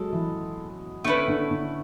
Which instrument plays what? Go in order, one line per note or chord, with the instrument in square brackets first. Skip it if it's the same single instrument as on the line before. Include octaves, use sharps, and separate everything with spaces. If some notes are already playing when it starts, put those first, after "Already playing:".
Already playing: [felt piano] F#3 G#3 [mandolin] A4
[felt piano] E3
[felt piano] D3 [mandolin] A3 C#4 E4 B4
[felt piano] D3
D3